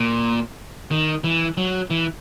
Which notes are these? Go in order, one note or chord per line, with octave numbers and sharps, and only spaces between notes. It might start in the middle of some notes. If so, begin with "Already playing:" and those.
Already playing: A#2
D#3
E3
F#3
E3